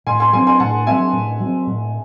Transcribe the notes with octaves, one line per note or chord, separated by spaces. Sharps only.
A2 G#5 C6
G#5 C6
F#3 C4 G#5 C6
G#5 C6
A2 F#5 A5
F#3 C4 E5 G#5
A2
F#3 C4
A2